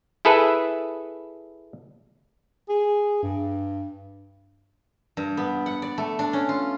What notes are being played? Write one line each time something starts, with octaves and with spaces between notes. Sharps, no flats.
E4 G#4 A4 B4 E5
G#4
G2
G2
B3
F#5
D5
A3
D4
C#4
F4